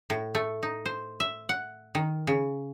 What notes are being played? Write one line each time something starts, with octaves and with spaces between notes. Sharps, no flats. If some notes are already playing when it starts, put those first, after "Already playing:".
A2
A3
D#4
C5
E5
F#5
D#3
C#3